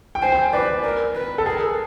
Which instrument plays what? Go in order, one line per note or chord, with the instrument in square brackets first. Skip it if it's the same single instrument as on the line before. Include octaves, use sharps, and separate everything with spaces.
[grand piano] G5
[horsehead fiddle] C5 [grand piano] G#5
[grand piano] G5
[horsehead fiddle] B4 [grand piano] D5
[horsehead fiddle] A#4
B4
[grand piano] A4
[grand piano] G#4 [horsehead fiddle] A#4